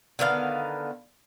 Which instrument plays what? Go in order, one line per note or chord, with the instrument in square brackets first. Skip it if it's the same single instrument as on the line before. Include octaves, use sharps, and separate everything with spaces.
[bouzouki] D3 D#3 B3 F5